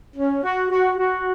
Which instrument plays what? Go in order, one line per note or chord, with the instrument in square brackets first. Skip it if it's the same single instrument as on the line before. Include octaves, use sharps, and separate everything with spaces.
[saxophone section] C#4
F#4
F#4
F#4